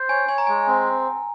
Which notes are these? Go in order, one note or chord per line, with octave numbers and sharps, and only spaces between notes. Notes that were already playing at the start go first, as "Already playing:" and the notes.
Already playing: C5
C#5 G#5
C#5 G#5
A#5
G#3 G#5
C4